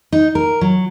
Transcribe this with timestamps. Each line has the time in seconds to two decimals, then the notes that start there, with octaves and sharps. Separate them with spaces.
0.12 D#4
0.35 A#4
0.61 F#3